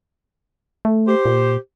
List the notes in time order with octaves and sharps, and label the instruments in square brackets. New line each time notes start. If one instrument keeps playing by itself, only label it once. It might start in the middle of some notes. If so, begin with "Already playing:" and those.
[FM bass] A3
[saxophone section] G4 C5
[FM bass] A#2